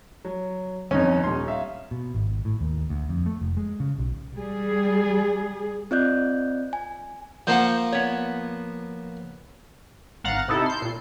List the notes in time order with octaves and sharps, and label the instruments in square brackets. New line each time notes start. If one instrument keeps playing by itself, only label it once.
[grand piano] F#3
[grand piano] G1 F2 [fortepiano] C#4 D#4
[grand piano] D#1 C6
E5 F5
[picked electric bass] B2
G#1
A2
D#2
D2
F2
A3
F1
G#3
C#3
B1
[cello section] G3 G#4
[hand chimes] C4 F4 D5 D#5 F#6 G6
G#5
[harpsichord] F3 A#3 [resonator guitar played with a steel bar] C5 F5 F#5
[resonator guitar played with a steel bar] B3 C#5
[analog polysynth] G#1 F5 F#5 A#5 F#6 A6
C3 D#4 E4 A4
C6 G6
A#2 C7